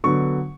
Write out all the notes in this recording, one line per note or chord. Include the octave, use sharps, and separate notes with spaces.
D3 F#3 B3 C#6